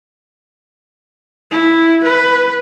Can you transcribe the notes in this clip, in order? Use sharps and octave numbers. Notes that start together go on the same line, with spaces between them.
E4
B4